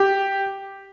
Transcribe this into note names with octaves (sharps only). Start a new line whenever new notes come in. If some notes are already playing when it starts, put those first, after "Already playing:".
Already playing: G4